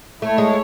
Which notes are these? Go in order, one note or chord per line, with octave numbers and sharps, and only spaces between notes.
A3 E4 A4 C#5
G#3